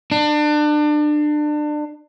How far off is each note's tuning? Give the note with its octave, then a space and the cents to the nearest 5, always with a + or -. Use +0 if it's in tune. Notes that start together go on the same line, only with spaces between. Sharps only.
D4 +30